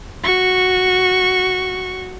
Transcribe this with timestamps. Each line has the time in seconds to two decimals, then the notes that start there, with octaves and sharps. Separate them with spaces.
0.24 F#4 C#6